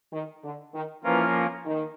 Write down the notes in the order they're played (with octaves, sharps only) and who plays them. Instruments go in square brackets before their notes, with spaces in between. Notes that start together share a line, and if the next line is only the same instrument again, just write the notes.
[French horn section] D#3
D3
D#3
[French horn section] E3 [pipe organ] F3 A#3 C#4 F4 A#4
[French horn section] D#3